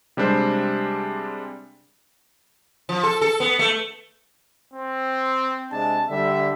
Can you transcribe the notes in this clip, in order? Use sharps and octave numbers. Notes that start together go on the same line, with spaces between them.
C3 G3 G#3 D4 C5
F3
A4
A4
B3
A3
C4
C3 G#3 D4 A5
D3 G3 E5